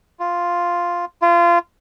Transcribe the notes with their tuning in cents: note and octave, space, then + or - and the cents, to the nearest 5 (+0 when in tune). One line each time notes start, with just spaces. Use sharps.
F4 +0
F4 -25